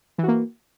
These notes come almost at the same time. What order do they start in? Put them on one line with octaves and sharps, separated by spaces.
E3 F#4 A#3